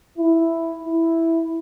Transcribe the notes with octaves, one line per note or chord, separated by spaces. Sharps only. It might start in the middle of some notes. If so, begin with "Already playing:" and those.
E4
E4